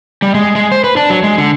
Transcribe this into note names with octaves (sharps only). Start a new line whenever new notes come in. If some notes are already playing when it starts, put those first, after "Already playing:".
G3
G#3
G#3
C5
B4
D4
F#3
G#3
D3